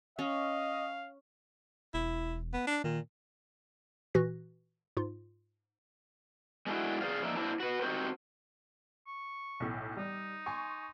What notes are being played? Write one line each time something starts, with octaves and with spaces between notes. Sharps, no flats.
C#4 D#5 F5
E1 E4
B3
D4
A#2 D#3
A#2 E3 F#4 F#6 A#6
G#2 F4
G#3 A3 C#4 D4 E4 F#4
G#4 C5 D5 F5
F3 A#3 D#4 D5 E5
A#3 C4 D4 E4 G4 A4
F#4 B4
C4 D#4 F#4 G4 A#4 C5
C#6
B1 A2
G3 D#4
G#5 C6 C#6